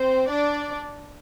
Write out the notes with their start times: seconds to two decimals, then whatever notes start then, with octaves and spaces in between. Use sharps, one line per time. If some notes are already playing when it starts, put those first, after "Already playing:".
Already playing: C4 C5
0.29 D4 D5